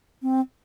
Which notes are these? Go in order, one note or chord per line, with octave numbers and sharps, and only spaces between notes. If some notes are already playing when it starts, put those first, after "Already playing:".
C4